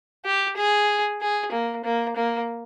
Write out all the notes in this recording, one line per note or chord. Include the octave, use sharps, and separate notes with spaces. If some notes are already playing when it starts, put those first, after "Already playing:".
G4
G#4
G#4
A#3
A#3
A#3